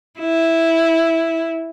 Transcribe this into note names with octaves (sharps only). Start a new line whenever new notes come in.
E4